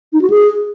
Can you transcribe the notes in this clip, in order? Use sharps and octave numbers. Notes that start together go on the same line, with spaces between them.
D#4
F#4
G#4